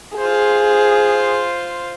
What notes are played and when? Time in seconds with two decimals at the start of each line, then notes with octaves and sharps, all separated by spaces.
0.18 F4 G#4 C5